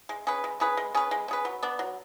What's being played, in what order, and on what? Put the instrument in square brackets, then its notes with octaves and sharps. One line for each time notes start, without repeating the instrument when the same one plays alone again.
[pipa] G#3
C#4 G#4 B4
G#3
C#4 G#4 B4
G#3
C#4 G#4 B4
G#3
C#4 G#4 B4
F#3
B3 D4
F#3